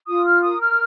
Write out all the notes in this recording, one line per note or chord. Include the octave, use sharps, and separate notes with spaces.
F4 D#6
F6
A#4 D#6
F6